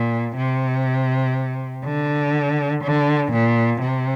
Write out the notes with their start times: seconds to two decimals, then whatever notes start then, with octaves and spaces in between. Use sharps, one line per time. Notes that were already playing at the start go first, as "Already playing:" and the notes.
Already playing: A#2
0.37 C3
1.85 D3
2.84 D3
3.32 A#2
3.81 C3